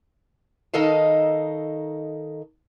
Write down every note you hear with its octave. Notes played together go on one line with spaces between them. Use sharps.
D#3 D#4 A4 D#5 F5 A5